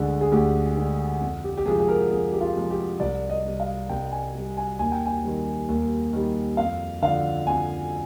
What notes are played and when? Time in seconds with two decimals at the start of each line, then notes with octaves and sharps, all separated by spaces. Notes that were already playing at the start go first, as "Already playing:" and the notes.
Already playing: D2 D3 G#3
0.21 G#4
0.32 D2 G4
0.77 D3 G#3
1.21 F2
1.44 G4
1.57 G4
1.65 C3 F3 G#3 G#4
1.80 G#4
1.88 A#4
2.11 F2 G#4
2.33 G4
2.41 F4
2.55 C3 F3 G#3
2.70 G4
3.00 C2 D5
3.30 D#5
3.45 C3 G3
3.60 F5
3.89 C2 G5
4.12 G#5
4.34 C3 G3
4.57 G#5
4.79 D#2 G#5
4.92 G5
5.06 G#5
5.24 D#3 G3
5.69 D#2
6.13 D#3 G3
6.57 F2 F5
7.02 D3 F3 F5
7.47 F2 G#5